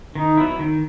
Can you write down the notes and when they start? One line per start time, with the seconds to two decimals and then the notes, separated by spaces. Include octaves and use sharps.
0.15 D#3 D#4
0.37 F#3 B3 E4
0.59 D#3